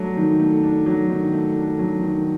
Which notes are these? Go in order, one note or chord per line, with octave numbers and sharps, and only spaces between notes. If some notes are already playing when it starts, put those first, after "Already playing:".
Already playing: F#3 A3 D4
D#3
A3
D4
F#3
D#3
A3
D4
F#3
D#3